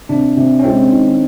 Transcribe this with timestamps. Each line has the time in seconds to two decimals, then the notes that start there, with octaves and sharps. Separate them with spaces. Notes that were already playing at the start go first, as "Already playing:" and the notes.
0.09 C3 D4
0.37 C3
0.59 C#4
0.64 G#3 C4
0.92 D#3